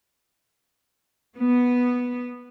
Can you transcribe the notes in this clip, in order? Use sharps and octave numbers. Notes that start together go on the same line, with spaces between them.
B3